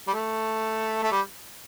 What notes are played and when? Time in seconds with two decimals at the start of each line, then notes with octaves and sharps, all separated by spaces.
0.08 G3
0.13 A3
1.03 A3
1.11 G3